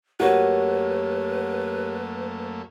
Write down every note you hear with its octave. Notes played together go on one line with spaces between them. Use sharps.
F#2 A3 A#3 F#4 G4 A#4 B4 C#5